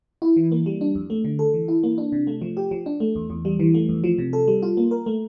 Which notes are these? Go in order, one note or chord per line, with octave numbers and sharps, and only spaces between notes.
E4
E3
A#3
G3
D4
F2
A3
D3
A4
E3
E4
A#3
D4
C3
A3
F3
G4
F3
D4
A3
E2
E2
G3
E3
A3
F2
F3
C3
A4
G3
F4
A#3
A#4
A3